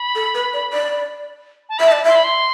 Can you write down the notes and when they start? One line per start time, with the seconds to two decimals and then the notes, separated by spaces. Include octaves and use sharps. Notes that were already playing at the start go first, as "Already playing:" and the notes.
Already playing: B5
0.15 A4
0.35 B4
0.54 D5
0.73 D5
1.69 A5
1.78 E5 B5
1.88 D5 A5
2.04 E5 C6
2.15 B5
2.24 C6